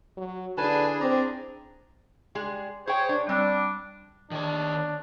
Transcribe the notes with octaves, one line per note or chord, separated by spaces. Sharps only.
F#3
D3 D4 E4 G#4 B4 G#5 A5
C4 D5 A#5
G3 G#3 G#4
G#4 C5 C#5 G5
D4
G3 C4 D4
D#3 D4 C#5